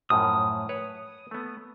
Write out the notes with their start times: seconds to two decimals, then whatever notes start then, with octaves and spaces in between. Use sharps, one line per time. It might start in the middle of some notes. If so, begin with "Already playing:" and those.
0.10 F#2 A2 F3 D#6
0.69 B4 C#5
1.31 A3 B3